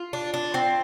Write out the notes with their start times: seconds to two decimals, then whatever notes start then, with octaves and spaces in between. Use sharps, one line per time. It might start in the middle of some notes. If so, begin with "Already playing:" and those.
Already playing: F4
0.13 D4
0.34 D4
0.54 C4